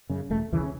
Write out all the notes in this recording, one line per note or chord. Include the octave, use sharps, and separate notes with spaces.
F#2 C#3
E1 A3
D#2 C#3 E3
C#4